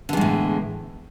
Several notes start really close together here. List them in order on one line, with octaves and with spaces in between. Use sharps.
D3 E2 G#3 A2